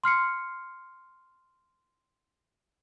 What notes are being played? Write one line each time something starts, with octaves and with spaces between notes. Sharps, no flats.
C6 F6 C7 C#7